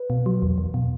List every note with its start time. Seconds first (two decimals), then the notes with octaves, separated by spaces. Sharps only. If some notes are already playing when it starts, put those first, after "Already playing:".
Already playing: B4
0.10 B2
0.26 F#3
0.42 E2
0.58 E2
0.74 B2